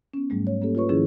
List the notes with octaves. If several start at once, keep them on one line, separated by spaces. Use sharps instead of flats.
B3 C#4
G#2 F#3 G3 A3
C#5
A#3 C#4 G4 A4
F4 G4 B4 C#5 C#6
G#2 D#3 F3 C#4 E4 G#4